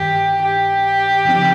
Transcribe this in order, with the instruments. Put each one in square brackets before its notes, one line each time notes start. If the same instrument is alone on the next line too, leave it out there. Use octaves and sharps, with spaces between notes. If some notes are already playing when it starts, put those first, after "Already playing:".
Already playing: [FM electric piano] G2 D#3 [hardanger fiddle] G4
[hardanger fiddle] G4
[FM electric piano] C#3 F3 C4 D#4